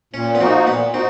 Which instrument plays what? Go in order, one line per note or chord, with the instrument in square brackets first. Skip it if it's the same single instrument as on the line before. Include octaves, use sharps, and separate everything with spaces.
[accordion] A#2 [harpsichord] C#4
[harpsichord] B3
[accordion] F3 A#3 D#4 F#4 [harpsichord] C4
[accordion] A#2 [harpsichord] B3
[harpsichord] C4 [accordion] D#4 F#4